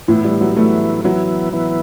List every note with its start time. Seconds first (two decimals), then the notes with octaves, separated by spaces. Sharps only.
0.08 A2 E3 B3 E4
0.24 G3
0.41 F#3
0.56 E3 A3 B3 E4
1.04 E3 F#3 B3 E4
1.53 E3 B3 E4